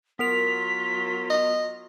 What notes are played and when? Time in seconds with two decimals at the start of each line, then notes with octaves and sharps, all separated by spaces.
0.19 F#3 B3 F4 A#4 B6 F7
1.30 D#5